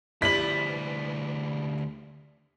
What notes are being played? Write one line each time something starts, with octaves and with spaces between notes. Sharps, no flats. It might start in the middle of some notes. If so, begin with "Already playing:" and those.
D2 F3 G3 E4 B4 B6 F#7